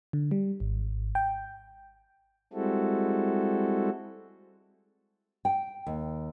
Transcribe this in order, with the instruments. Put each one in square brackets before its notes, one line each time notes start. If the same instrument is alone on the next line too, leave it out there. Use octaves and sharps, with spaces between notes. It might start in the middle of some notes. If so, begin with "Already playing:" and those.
[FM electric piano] D3
G3
G#1
G5
[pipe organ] G3 G#3 C4 E4 F#4 A4
[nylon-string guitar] G5
D#2